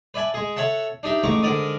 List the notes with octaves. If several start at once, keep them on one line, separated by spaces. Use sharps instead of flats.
B4 D5 E5 G#5 A5
G#3 G#4
A4 C#5 E5 F#5 A5
D4 D#4 G4 E5
A1 G#3 A3 A#5 C#6 D6
G#2 D3 D4 A#4 D5 D#6